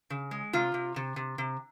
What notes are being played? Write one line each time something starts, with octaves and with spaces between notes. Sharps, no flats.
C#3
G#3
C3 F4
C3
C3
C3
C3